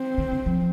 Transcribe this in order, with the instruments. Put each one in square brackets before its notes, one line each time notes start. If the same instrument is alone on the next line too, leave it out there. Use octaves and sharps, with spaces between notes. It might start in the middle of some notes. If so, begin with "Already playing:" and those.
Already playing: [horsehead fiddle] C4
[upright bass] D#3
D3
F3